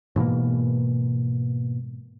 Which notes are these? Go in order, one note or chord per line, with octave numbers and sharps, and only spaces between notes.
G#2 B2 E3 A#3